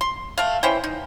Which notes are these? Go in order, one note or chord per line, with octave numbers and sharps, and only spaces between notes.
C6
A3 F5
E3 C#4 C5 G5
D#4